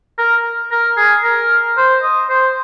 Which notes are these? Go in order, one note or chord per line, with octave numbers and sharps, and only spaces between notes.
A#4
A#4
G#4
A#4
C5
D#5
C5